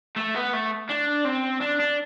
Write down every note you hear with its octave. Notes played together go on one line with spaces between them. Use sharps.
A3
B3
A3
D4
C4
D4
D4